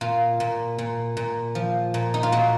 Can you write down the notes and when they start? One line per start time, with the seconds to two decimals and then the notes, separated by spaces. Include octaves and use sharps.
0.01 A#2 F4
0.40 A#2
0.78 A#2
1.17 A#2
1.55 F3
1.94 A#2
2.14 D#4
2.23 F4
2.32 A#2 F#4